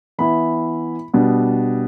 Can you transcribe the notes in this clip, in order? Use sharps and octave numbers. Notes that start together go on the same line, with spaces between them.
E3 B3 E4 B5
B2 G3 B3 D4